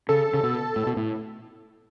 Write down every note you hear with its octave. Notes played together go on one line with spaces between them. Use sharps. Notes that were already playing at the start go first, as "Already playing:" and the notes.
C#3 A4
C#3
B2
A2
B2
A2